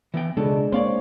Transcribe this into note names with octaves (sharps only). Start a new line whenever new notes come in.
E3 B3 G5
C#2 B2 G#3 D4 A4
A#3 C4 C#5 D5 F5 C6